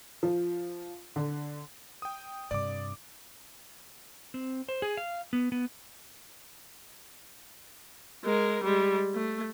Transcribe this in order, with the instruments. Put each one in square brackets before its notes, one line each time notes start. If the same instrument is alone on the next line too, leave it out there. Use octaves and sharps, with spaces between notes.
[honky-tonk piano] F3
D3
[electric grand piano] G5 D#6
[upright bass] G2 C3 [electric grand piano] D5 D6
[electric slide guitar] C4
C5
G#4
F5
B3
B3
[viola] G#3 A#4
G3 G#3
A3